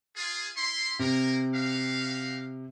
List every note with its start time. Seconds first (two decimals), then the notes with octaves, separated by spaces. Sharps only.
0.16 F4 G#4
0.55 E4 C6
0.99 C3 A#3 A#4
1.54 F#4 G4 F5